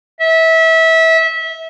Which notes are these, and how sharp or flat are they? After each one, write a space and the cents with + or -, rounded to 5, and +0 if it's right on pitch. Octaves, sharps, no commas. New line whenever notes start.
E5 -25